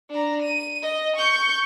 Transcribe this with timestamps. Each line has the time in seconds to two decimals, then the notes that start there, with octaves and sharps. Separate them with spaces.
0.10 D4 A#5
0.42 D#7
0.82 D#5
1.16 C#6 G6